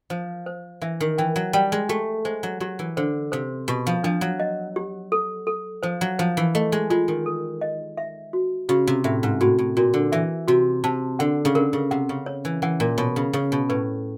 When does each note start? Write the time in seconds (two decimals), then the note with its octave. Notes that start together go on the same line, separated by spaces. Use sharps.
0.10 F3 C5
0.46 C5
0.82 E3 E5
1.00 D#3
1.18 E3 G5
1.36 F#3
1.53 G3 G5
1.72 G#3
1.89 A3 G4
2.25 G#3 C5
2.43 F#3
2.60 F#3 G4
2.79 E3
2.97 D3 C5
3.32 C3 C5
3.68 B2 G4
3.87 F3
4.04 F3 D4
4.21 F#3
4.40 D#5
4.76 G4
5.12 A4
5.47 A4
5.83 F3 C5
6.01 F#3
6.19 F3 C5
6.37 E3
6.55 A3 D#5
6.72 G#3
6.90 G#3 F4
7.08 D#3
7.26 A4
7.61 D#5
7.97 E5
8.33 F#4
8.69 C#3 F#4
8.87 C3
9.04 A2 E5
9.23 G#2
9.41 A2 F#4
9.59 A2
9.77 A#2 F#4
9.94 D3
10.12 E3 E5
10.48 C3 F#4
10.84 C3 A5
11.19 D3 F#5
11.45 C#3
11.55 D3 A#4
11.73 C#3
11.91 C3 F#5
12.09 C#3
12.26 C#5
12.45 E3
12.62 E3 F#5
12.80 A#2
12.98 B2 C#5
13.16 C#3
13.33 C#3 C#5
13.52 B2
13.69 A2 B4